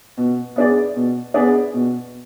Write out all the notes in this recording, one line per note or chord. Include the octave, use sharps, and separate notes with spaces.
B2
B3 D4 G#4 D5
B2
B3 D4 G#4 D5
B2